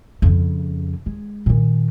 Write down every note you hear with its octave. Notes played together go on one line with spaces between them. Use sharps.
F2 C#3
G#3
A#2 D#3